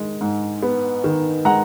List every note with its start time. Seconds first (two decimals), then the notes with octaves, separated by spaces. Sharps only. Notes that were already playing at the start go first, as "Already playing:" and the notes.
Already playing: D#3 G#3
0.21 G#2
0.63 B3
1.04 D#3
1.45 G#3 F#5 A#5